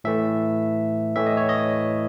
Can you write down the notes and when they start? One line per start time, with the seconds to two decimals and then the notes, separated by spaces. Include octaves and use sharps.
0.04 A2 E3 A3 E5
1.16 A2 E3 A3 E5
1.26 D#5
1.37 C#5
1.49 D#5